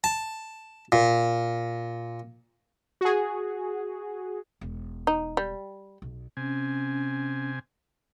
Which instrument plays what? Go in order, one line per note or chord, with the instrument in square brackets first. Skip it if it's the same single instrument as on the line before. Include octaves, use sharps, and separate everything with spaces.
[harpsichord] A5
A#2
[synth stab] F#4 G#4
[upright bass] E1
[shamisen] D#4
G3
[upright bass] B1
[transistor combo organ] C3 G#5 [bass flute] C#4